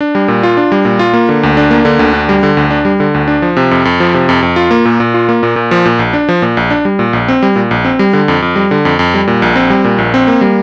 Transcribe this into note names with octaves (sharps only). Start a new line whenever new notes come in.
D4
G3
A#2
F4
D4
G3
A#2
F4
A#3
D3
D2
D4
A#3
D3
D2
D4
G3
D3
D2
D4
G3
D3
D2
D4
F3
C3
F2
F2
F3
C3
F2
F2
F4
A#3
A#2
A#2
F4
A#3
A#2
A#2
F3
A#2
A#1
D4
F3
A#2
A#1
D4
G3
A#2
A#1
C4
G3
A#2
A#1
C4
G3
D3
F2
F2
G3
D3
F2
F2
G3
A#2
A#1
C4
G3
A#2
A#1
C4
A#3
G3